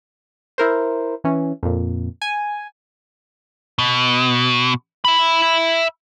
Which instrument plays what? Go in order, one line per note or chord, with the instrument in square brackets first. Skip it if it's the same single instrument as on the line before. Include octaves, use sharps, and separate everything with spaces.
[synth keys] E4 A#4 C5
E3 C#4
F2 A#2
G#5
[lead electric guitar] B2
E5 B5